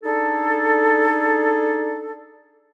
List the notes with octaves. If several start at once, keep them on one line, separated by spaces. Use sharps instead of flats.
D4 D#4 G#4 A4